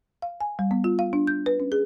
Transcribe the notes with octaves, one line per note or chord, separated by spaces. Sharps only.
F5
G#5
G3
B3
F4
F5
D4
G6
B4
C#4
G#4